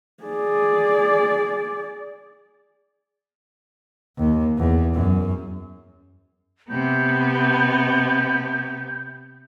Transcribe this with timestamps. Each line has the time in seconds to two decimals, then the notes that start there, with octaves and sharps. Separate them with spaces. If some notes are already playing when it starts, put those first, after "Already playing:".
0.24 G#4 D5
4.17 D#2
4.58 E2
4.94 F#2
6.70 C3 B3 G6